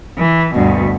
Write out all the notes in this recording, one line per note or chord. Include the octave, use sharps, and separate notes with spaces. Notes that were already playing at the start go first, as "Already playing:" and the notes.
E3
D2 G2 B2